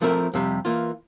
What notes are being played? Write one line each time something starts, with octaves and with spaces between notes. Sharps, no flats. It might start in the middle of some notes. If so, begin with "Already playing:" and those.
F3 A3 C4 E4 A#4
F2 C3 G3
E3 A#3 F4